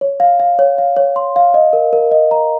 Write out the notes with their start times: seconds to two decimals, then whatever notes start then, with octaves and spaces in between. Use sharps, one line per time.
0.01 C#5
0.20 F5
0.40 F5
0.59 C#5
0.78 F5
0.97 C#5
1.16 C6
1.36 F5
1.54 D#5
1.73 A#4
1.93 A#4
2.12 D#5
2.31 A#5